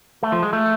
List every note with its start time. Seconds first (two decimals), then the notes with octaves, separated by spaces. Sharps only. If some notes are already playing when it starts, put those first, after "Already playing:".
0.23 A3
0.32 F3
0.43 G#3
0.53 A3